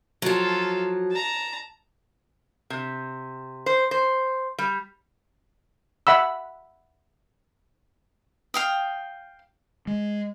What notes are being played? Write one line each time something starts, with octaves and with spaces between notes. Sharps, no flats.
F3 F#3 F4 A4
A5 A#5
C3
C5
C5
G3
E5 F#5 B5 E6
F5 G5 D#6
G#3